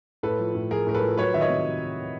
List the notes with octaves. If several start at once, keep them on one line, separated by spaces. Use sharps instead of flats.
A2 A4 B4
F3
A2
F3 G#4 A#4
A2 A#4
A4 B4
F3
F#3 B4 C#5
D#3 E5
C#5 D#5
C3